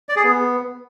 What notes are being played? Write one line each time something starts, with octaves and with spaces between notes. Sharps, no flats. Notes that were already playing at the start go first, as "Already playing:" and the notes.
D5
G#4
B3